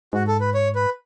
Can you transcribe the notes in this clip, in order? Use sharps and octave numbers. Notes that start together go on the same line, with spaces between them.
G#2 F#4
A4
B4
C#5
B4